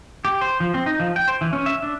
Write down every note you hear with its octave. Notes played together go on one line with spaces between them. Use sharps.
G4
C5
F3
C4
D#4
F3
G5
C5
E3
C#4
E5
D4